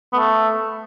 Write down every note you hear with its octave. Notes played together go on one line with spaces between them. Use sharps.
B3
A3